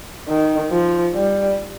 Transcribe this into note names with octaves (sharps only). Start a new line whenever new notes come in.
D#3
F3
G3